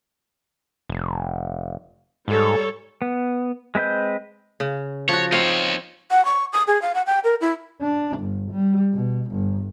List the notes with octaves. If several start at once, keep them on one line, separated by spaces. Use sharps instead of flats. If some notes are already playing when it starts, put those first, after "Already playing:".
F1
G#2 G3 A4 C#5
B3
G#3 C4 B4 D#5 G6
C#3
F3 F#4 C#5
C4 D#4 C#5 F5
F#5
C#6
D#6
G#4
F5
F#5
G5
A#4
E4
D4
G1
G3
B2
G1